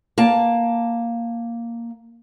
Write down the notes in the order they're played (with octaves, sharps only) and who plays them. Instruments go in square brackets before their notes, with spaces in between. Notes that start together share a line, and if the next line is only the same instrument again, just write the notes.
[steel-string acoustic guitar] A#3 A5